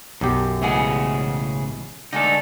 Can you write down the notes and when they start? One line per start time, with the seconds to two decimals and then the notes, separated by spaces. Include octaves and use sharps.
0.21 B1 F#2 G4
0.62 A2 C#3 E3 G#3 G#4 F#5
2.13 D3 G#3 A3 D#4 A4